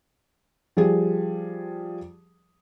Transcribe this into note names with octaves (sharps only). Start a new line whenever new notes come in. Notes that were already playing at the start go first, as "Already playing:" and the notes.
F3 G3 G#4